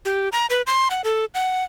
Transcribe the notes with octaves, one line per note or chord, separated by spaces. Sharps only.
G4
A#5
B4
C6
F#5
A4
F#5